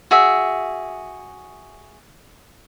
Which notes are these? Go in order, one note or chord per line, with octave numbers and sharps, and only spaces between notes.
F#4 G#4 E5